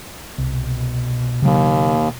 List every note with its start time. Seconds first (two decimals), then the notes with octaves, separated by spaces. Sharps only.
0.38 C2 B2
1.42 D#2 C#3 F#3 A#3